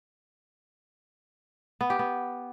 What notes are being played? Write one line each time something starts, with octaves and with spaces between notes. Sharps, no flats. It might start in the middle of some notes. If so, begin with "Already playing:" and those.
B3
G4
B3